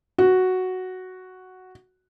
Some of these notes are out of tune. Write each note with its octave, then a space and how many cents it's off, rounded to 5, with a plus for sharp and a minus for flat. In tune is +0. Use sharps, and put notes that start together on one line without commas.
F#4 +0